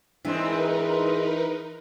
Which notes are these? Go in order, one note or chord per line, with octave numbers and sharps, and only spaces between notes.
G#2 E3 G#3 C4 D4 D#4 A#4 B4